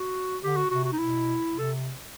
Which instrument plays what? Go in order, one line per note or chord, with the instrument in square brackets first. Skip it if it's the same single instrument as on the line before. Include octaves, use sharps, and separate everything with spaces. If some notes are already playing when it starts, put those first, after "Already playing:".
Already playing: [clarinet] F#4
[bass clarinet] D3 [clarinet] G4
[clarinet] F#4
[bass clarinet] C3 [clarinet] F#4
[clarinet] F#4
D#4
[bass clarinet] B2 [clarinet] E4
[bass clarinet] C3 [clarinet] A4